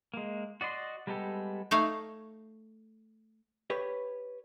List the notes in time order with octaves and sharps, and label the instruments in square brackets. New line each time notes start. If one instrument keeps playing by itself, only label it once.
[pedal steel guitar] G#3 A#3
F#4 D5 D#5 C6
G3 G#3 B3 G4 A4
[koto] A3 D#4 C#5 F5
[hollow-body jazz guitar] G4 B4 C#5